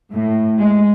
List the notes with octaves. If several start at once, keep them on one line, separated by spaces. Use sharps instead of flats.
A2
G#3